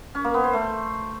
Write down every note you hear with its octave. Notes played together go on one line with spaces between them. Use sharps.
C#4
A#3
B3
C5
A3